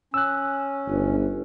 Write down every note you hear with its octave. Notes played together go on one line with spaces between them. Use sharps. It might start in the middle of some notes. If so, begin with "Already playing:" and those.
C#4 E6 F#6
G1